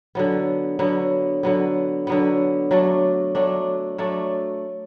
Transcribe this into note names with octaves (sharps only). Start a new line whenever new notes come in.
D3 F#3 B3
D3 F#3 B3
D3 F#3 B3
D3 F#3 B3
F#3 A3 D4
F#3 A3 D4
F#3 A3 D4